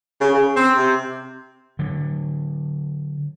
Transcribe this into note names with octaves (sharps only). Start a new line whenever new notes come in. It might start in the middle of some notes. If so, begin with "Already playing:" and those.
C#3
C#3
C4
C3
D3 F#3